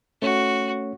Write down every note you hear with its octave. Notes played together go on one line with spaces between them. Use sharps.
A3 C#4 F#4 C#5